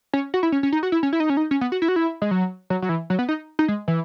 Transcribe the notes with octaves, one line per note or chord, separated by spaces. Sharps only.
C#4
F#4
E4
C#4
C#4
D#4
F#4
E4
C#4
E4
D#4
C#4
D#4
C#4
B3
F#4
E4
F#4
E4
G#3
F#3
F#3
F#3
E3
F#3
B3
D#4
D#4
G#3
E3